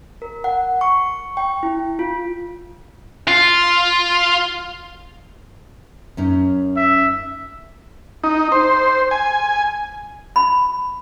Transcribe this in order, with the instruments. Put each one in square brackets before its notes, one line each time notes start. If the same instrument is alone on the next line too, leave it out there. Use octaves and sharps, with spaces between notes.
[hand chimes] A#4
F#5
C#6
G5
E4
F4
[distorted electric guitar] F4
[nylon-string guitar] F#2 C#4 D#4
[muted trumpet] E5
[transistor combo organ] D#4
C5
G#5
[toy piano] B5